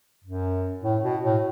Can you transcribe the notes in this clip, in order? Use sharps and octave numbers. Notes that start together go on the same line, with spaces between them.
F#2
A2
B2
A2